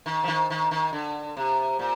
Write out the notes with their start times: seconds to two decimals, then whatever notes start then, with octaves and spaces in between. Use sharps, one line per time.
0.06 D#3
0.24 F3
0.28 D#3
0.50 D#3
0.71 D#3
0.93 D3
1.37 C3
1.79 A#2